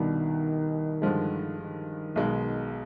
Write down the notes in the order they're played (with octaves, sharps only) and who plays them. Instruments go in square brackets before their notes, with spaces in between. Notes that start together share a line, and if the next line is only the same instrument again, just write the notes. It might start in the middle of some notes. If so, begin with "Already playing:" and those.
Already playing: [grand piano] C2 B2 B3 D4 [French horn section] D#3
[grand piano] G2 D3 F3 G#3
[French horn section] D#3
[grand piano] B1 B2 G#3